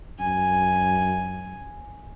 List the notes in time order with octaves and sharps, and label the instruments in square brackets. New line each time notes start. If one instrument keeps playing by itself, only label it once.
[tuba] F#2 [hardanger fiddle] G#5